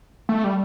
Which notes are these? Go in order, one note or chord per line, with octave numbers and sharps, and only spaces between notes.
A3
G3